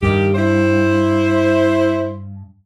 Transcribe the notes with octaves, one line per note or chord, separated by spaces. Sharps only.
G2 D#3 G4
E4 C5